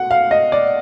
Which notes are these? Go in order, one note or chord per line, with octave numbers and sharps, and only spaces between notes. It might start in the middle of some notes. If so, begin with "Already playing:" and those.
Already playing: B2 F#5
F5
D#5
D5